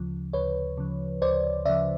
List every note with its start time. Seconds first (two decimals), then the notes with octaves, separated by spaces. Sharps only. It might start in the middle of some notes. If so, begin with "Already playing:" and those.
Already playing: D2 C#3 F3
0.33 D2 B4 C#5
0.78 C#3 F3
1.22 D2 C5 D5
1.65 C#3 F3 D5 E5